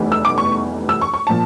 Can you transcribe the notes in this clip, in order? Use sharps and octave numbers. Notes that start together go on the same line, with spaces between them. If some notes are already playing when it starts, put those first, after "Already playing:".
Already playing: F1 E2 E3 G3
E6
D6
C#6
E6
C#6
C#6
A#2 F3 A5